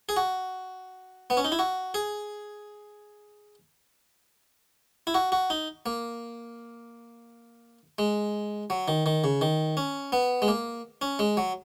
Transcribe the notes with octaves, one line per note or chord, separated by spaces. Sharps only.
G#4
F#4
B3
C#4
D#4
E4
F#4
G#4
E4
F#4
F#4
D#4
A#3
G#3
F#3
D#3
D#3
C#3
D#3
C#4
B3
G#3
A#3
C#4
G#3
F#3